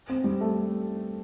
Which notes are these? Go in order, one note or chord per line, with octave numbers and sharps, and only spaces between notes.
C4
G3
A3